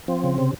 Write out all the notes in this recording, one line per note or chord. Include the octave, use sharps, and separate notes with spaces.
F3 C4
C#3
C3